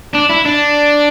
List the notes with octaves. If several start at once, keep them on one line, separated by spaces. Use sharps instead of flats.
D4
E4
D4